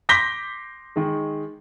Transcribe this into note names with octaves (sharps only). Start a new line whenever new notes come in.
C6 D6 G6 A#6 B6 G7
D#3 G#3